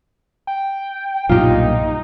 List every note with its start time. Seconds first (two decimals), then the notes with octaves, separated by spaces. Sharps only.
0.47 G5
1.29 B1 G2 A#2 D#4 F4 G4